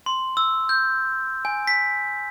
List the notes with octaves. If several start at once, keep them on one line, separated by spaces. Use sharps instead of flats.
C6
E6
G6
G#5
B6